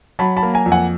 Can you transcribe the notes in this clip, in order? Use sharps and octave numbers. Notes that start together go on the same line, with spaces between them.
F#3 A5 B5
A5 B5
A#3
G#5 A#5
F2
F#5 G#5